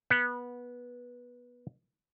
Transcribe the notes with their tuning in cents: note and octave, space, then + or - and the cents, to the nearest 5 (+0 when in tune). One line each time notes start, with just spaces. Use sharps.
B3 -15